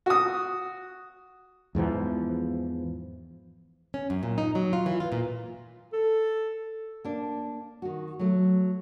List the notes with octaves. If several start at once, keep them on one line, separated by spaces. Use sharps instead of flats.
F#4 D#6
E2 G#2 E3 F3
C#4
F#2
A#2
D#4
F#3
F4
E3
F4
A#2
A4
A#3 D4
D#3 F#4
F#3 A3